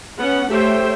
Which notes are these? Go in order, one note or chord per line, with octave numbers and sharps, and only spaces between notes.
B3 C#4 F#5
A3 G4 C5 C#5 E5 G5